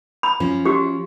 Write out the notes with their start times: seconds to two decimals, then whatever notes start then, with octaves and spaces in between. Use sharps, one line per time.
0.23 B5
0.40 F3 C#4
0.65 F#4 G4